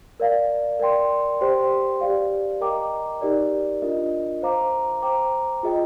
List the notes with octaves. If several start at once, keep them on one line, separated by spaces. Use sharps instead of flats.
A#4 D5 F5
A#4 D5 G5 C6
G4 C5 G5 C6
G4 D5 F5
A#4 D#5 G5 A#5 D6
D#4 G4 A#4 D5
D4 F4 A#4 D#5
C5 F5 A#5 D6
C5 G5 A#5 D6
F4 G#4 D#5 G5